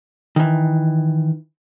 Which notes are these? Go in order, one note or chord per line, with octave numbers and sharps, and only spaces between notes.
D#3 E3